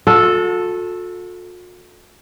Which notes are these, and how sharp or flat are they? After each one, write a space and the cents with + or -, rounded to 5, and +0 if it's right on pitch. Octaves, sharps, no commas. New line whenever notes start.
F#4 -45 A4 +0